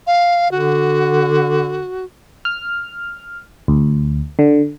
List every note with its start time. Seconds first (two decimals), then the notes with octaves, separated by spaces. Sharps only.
0.07 F5
0.51 D3 F#4
2.45 F6
3.68 D2
4.39 D3